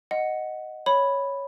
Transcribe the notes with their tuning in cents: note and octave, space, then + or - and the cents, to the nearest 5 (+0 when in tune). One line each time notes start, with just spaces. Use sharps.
D#5 +0 F#5 +0
C#5 +0 B5 +0